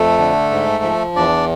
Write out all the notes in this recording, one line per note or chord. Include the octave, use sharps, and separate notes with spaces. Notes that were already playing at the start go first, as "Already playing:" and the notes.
Already playing: F2 A3 A4
D3
G#2
F3
E2 D4 D5